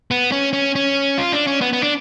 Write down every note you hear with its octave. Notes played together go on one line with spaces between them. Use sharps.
B3
C#4
C#4
C#4
F4
D4
C#4
B3
B3
D4